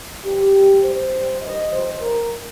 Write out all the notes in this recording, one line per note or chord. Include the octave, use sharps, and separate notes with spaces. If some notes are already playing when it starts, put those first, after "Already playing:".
G2 F3 G4
A#2 G3
G2 G3 C5
G2 G3
G2 D#3 G3 D#5
F2 C3 G3 C5
G2 D#3 G3 A#4